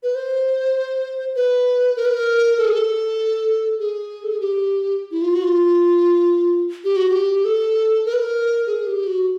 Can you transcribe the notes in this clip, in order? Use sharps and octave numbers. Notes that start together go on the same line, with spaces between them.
B4
C5
B4
A#4
B4
A#4
A4
G#4
A4
G#4
A4
G#4
G4
E4
F4
F#4
F4
G4
F#4
G4
A4
A#4
B4
A#4
G#4
G4
F#4